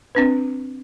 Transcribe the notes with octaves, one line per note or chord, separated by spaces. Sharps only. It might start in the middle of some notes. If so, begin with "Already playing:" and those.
C4 D4 B4